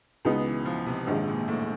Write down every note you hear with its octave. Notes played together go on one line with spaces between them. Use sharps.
C#2 B2 G#3 B3 D#4
E3
F3
C3
A#1 G#2 D#3 G#3
A#2
A2